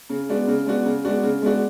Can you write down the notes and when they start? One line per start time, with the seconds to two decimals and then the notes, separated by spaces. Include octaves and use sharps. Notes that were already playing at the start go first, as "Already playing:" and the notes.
0.10 C#3
0.29 G#3 B3 D4 F#4
0.48 C#3
0.66 G#3 B3 D4 F#4
0.86 C#3
1.05 G#3 B3 D4 F#4
1.23 C#3
1.42 G#3 B3 D4 F#4